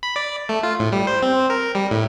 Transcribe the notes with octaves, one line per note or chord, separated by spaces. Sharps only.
B5
D5
A3
F4
A2
G3
C5
C4
A#4
G3
A2